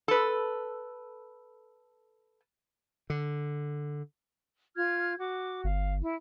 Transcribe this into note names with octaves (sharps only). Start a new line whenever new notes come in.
A4 B4
D3
F4 F6 G#6
F#4 D6
G1 F5
E4